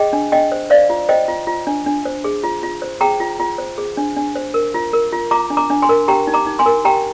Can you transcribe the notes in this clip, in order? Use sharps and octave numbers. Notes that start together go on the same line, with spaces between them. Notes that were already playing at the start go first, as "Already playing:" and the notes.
Already playing: G#4 D#5 G5
D4
D4 D#5 G5
C5
C5 D5 F5
F4
C5 D#5 G5
F4
F4
D4
D4
C5
G#4
F4
F4
C5
G#4 G5 A#5
F4
F4
C5
G#4
D4
D4
C5
A#4
F4
A#4
F4
F4 A#5 D6
D4
A#5 D6
D4
G#5 C6
A#4
G4 G5 A#5
D#4
A#5 D6
D#4
G#5 C6
A#4
G4 G5 A#5